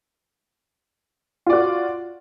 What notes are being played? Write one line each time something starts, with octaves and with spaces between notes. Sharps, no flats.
F4 F#4 D5